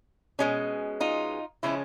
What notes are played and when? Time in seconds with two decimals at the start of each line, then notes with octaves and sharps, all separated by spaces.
0.39 B2 G#3 C#4
1.00 D#4 F4
1.63 C#3 F3 G#3 C#4 E4